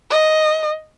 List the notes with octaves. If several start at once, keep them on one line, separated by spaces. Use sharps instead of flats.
D#5